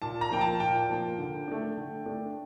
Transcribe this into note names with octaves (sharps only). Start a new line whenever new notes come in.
A#2 A5
A#5
F3 A#3 G5
A5
A#2 G5
F3 A#3
D3
A3 D4
D3
A3 D4